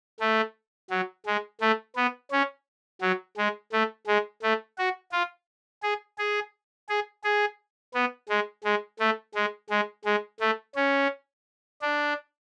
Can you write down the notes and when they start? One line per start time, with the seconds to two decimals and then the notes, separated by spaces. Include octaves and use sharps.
0.20 A3
0.90 F#3
1.26 G#3
1.61 A3
1.96 B3
2.32 C#4
3.01 F#3
3.37 G#3
3.73 A3
4.07 G#3
4.43 A3
4.78 F#4
5.12 F4
5.83 G#4
6.18 G#4
6.89 G#4
7.24 G#4
7.94 B3
8.29 G#3
8.64 G#3
9.00 A3
9.35 G#3
9.70 G#3
10.05 G#3
10.40 A3
10.76 C#4
11.82 D4